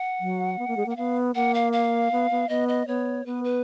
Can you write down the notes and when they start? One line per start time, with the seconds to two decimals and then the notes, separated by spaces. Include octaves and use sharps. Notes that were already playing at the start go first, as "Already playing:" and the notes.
Already playing: F#5
0.20 F#3
0.59 B3
0.68 A#3
0.77 G#3
0.86 A#3 F#5
0.97 B3 F5
1.35 A#3 F#5
1.54 F5
1.73 F5
2.12 B3
2.31 B3
2.49 B3 D#5
2.68 D#5
2.87 B3 C#5
3.26 B3 B4
3.44 B4